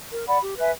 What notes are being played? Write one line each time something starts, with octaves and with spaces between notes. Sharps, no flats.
A#4
D5 F#5 B5
G4
B4 E5 G#5